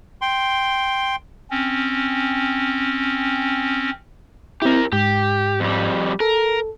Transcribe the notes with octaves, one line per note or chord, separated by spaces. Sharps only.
G5 C6
C4 C#4
C4 E4 G4 A#4
G#2 G4
F2 G3
A4 A#4